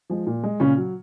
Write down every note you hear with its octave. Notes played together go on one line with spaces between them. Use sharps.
F3 G#3
A#2
G#3
A#2 C#3 C#4
F#3